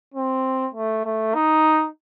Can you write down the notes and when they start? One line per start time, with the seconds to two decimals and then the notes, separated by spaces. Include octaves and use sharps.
0.14 C4
0.74 A3
1.05 A3
1.34 D#4